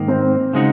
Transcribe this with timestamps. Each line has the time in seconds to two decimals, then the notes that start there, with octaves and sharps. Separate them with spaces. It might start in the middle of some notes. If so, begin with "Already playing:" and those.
Already playing: G#2 D#3 A#3
0.08 C4 C5
0.53 C#3 G#3 D#4 F#4